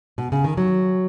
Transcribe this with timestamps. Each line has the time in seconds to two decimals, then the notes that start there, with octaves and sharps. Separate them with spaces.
0.18 B2
0.32 C#3
0.44 D#3
0.57 F#3